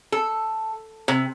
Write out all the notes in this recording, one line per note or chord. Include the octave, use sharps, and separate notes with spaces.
A4
C3